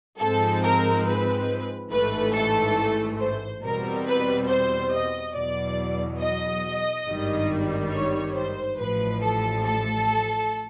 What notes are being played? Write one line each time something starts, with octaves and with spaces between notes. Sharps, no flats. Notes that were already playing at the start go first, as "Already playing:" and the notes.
G#2 F3 G#3 C4 A4
A#4
B4
A1 G#2 E3 A3 B4
A4
C5
E2 B2 G3 C4 A#4
B4
C5
D#5
E2 B2 F#3 D5
D#5
G#1 G2 D#3 G3
C#5
C5
A1 A2 F3 B4
A4
A4